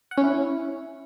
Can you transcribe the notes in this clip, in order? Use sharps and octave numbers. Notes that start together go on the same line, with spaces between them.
F#5
C#4
E4